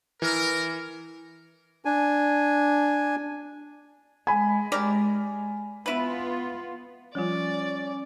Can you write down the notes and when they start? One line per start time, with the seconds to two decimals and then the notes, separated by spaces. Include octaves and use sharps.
0.22 E3 A#4
1.85 D4 G#5
4.27 G#3 G#5 B5
4.72 G4 A#4 D5
5.86 B3 E4 F4 B4
7.15 F3 G3 C#4 F4 D5